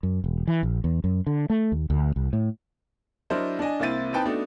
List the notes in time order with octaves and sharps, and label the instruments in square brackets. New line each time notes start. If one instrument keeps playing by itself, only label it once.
[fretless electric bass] F#2
E1
E3
A#1
E2
F#2
D3
A3
D#2
D2
C2
A2
[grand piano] F#3 D4 E4 A#4 C5 D#5
D4 D5 D#5 G#5
C2 A#3 C4 E4 A6 D#7
C4 D#4 B4 G5 A5
A3 B3 D4 D#4 F#4